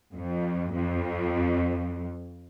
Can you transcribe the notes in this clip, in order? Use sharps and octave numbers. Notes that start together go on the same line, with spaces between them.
F2
F2